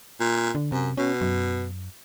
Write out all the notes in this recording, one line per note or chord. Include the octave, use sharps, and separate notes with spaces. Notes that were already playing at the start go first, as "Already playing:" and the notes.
A#2
D3
F#2 C3
B2 C#4
F#2